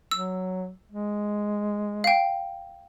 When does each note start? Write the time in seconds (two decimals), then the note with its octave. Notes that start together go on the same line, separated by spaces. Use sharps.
0.11 F#3 E6
0.92 G#3
2.04 F5 G5